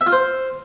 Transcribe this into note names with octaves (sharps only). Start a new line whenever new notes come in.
E5
F4
C5